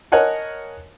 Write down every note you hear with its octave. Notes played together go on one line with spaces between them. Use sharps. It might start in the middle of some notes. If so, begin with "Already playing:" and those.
A#4 C#5 D#5 F#5 G#5 A5